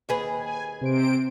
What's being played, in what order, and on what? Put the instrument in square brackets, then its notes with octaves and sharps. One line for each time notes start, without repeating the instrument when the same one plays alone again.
[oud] D#2 G#4 B4
[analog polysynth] G#5
C3 C5 D7